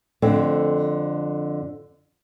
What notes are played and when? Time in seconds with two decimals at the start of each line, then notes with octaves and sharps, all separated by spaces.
0.22 F2 D3 A3 C4